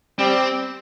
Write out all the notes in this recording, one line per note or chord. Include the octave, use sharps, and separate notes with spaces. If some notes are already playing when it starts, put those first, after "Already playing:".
G3 C4